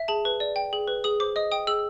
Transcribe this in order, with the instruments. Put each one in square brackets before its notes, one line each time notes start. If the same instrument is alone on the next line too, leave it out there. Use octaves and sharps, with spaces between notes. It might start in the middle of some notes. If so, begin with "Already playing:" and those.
Already playing: [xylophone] E5
G#4 A5
B4
D5
G5
G#4
B4
G#4 D#6
C5 D6
D#5 D#6
G5 D#6
G#4 E6